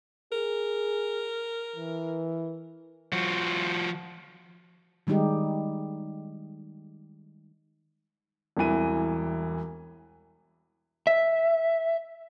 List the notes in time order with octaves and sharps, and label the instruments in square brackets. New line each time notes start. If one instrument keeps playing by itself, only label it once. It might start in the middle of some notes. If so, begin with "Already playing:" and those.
[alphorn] G#4 [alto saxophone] A#4
[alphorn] E3
[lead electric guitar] F3 F#4
[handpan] D#3 G3 G#3 D#4 G4
[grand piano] E1 C2 E3 D#7
[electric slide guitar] E5